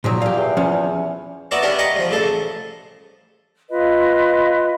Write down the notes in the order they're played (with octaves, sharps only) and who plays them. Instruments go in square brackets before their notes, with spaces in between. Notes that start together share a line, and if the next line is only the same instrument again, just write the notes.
[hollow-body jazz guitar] A#2 F3 F#3
[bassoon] A#2 [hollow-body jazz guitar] G4 F5
[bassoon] E2
[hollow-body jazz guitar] F3 C#4
[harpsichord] B3 E4 F#4 D5 A5 A#5
B3 C#4 D4 E4 G4
D#5 G5 A#5 B5 C#6 D6
G2 F3
A1 C#3 A4 A5
[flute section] F4 B4 D#5